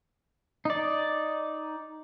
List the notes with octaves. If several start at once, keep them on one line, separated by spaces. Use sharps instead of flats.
D#4 D5